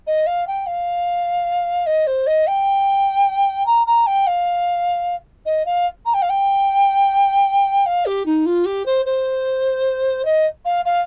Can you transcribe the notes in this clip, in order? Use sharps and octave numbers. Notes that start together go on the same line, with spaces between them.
D#5
F5
G5
F5
D#5
C5
D#5
G5
A#5
A#5
G5
F5
D#5
F5
A#5
G5
F5
G5
F5
G4
D#4
F4
G4
C5
C5
D#5
F5
F5